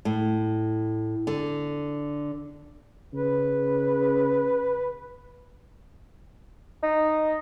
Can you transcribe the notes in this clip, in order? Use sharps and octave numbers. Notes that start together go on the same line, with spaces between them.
A2
D3
C#3 B4
D#4